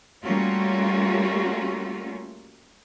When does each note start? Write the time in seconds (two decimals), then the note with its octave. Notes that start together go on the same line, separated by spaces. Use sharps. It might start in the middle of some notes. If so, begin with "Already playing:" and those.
0.24 G3 A3 A#3 C#4 F4 F#4